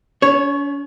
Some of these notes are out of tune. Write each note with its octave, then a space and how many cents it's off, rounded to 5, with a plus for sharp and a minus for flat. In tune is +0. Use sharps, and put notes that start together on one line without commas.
C#4 +45 C#5 +0